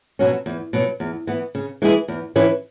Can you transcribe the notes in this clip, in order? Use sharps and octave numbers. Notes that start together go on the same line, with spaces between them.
B2 F#3 C#4
E2
B2 F#3
E2
E3 B3
C#3
E3 G#3 E4 G#4
E2
E3 C#4 E4 B4